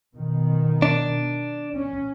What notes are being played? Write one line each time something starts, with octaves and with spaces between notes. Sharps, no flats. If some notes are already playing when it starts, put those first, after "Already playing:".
B2 D#3
D4
C#4